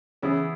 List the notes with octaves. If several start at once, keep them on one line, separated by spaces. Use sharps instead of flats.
C#3 E3 B3 C#4 E4 G#4